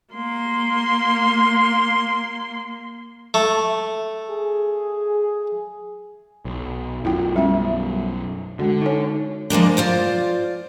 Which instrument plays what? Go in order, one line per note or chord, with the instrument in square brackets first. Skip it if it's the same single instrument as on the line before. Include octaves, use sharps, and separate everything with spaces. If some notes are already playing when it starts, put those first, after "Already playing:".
[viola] A#3 C6
[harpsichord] A3
[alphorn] G#4
[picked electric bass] B1
[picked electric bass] B1 F#2 [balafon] E4 F4 G5
[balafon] G3 C#4 E5
[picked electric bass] D3 [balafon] G#3 F#4
[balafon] D#4 A4 C#5
[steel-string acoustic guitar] F3 G#3 A#3 D4
F4 C5 D5